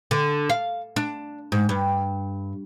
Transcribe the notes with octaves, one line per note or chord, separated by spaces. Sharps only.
D3
F5
D4
G#2
G2